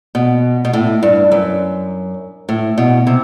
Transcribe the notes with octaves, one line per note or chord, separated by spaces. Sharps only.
B2
B2
A2
G2
F#2
A2
B2
C3